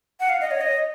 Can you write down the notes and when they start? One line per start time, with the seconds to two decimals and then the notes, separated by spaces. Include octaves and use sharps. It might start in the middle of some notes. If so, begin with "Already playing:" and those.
0.20 F#5
0.29 F5
0.41 D#5
0.51 C#5
0.61 D#5